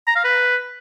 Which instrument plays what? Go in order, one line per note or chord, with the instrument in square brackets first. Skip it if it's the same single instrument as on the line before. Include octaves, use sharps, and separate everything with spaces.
[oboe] A#5
F5
B4